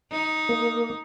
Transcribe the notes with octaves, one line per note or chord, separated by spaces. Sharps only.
D#4
A#3